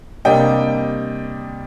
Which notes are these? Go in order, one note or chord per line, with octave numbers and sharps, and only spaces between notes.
C3 G3 A#3 D4 D#5 G5